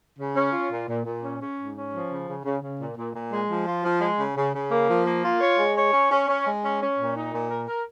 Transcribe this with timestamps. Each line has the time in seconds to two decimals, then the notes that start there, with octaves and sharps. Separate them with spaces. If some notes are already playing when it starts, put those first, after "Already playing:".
0.18 C#3
0.35 C#4
0.52 F4
0.70 A#2
0.88 A#2
1.05 A#2
1.22 C#4
1.40 C#4
1.57 G#2
1.75 C#4
1.92 F3
2.10 C#3
2.28 C#3
2.45 C#3
2.62 C#3
2.79 A#2
2.97 A#2
3.14 A#2
3.32 G#3
3.49 F3
3.67 F4
3.84 F3
4.01 G#3
4.19 C#3
4.36 C#3
4.54 C#3
4.71 A#3
4.89 F3
5.06 A#3
5.24 F4
5.41 C#5
5.59 G#3
5.76 C#5
5.93 C#4
6.11 C#4
6.28 C#4
6.46 G#3
6.63 C#4
6.81 C#4
6.98 A#2
7.16 D#4
7.33 A#2
7.50 A#4
7.68 A#4